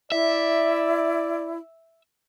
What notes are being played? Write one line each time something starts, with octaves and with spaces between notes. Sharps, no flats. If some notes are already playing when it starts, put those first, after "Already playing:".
E4 D5 E5